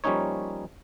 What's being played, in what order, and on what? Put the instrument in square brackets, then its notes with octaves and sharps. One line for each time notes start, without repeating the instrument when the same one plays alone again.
[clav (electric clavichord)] F3 G3 A#3 C#4 D#4 C#5